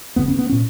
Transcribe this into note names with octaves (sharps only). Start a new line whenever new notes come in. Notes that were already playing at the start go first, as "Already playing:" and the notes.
F#1 F2 C#3 B3
C#4
B3
A#2 C#4